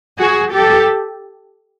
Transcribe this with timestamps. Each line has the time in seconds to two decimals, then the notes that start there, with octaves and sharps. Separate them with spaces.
0.19 F#4 G#4
0.52 G4 A4